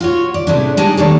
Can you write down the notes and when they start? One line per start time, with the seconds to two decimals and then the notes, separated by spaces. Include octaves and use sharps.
0.01 F4 F#4 C#5
0.34 D5
0.47 A2 C3 G#3 A3 B3 D4
0.77 G#3 D4 D#4 G4 G#4
0.97 D#3 A#3 D4 D#4 A4 C#5